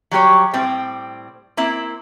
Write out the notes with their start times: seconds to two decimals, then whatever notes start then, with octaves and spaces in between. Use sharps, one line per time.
0.11 F#3 G3 G4 C#5
0.54 A2 G3 C4
1.57 A#3 C4 E4